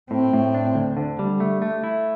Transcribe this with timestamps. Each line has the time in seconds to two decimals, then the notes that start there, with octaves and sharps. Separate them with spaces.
0.11 A2 C4
0.33 A2
0.54 D4
0.75 D2
0.97 D3
1.19 G3
1.40 A3
1.62 A3
1.84 E4